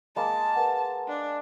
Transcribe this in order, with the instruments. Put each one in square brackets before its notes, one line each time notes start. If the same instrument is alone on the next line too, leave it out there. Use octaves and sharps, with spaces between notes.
[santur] G#3 A#3 [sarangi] A5
[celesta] A#4 B4 F#5
[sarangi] D4